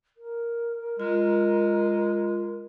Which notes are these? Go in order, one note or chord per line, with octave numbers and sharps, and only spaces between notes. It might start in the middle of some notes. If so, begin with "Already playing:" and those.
A#4
G#3 F4